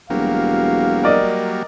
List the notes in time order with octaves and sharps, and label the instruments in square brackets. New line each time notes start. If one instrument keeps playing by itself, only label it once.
[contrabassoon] E1 [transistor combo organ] F#3 G3 A#3 [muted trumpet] F5
[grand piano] A#4 D5 D#5